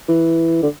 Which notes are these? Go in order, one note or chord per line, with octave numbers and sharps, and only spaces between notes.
E3
D3